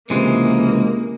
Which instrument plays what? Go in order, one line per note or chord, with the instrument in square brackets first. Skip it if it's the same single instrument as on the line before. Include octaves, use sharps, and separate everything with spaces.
[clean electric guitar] C#2 C3 E3 G#3 [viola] A#3